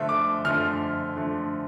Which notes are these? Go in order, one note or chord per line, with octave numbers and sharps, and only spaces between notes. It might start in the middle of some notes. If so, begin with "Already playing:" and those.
Already playing: D3 F3 A3 E5
D6
D3 F3 A3 F6
D3 F3 A3